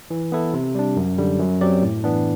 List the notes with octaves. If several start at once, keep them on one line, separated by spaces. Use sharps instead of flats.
E3
B3 E4 A4
C3
G3 D4
F#2
D3 G3
F#2
F#3 C4 G4 D5
A2
E3 B3 D4